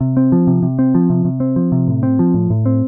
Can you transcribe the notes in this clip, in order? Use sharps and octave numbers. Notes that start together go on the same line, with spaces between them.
C3
C4
F3
C3
C3
C4
F3
C3
C3
C4
F3
C3
A2
C4
F3
A2
A2
C4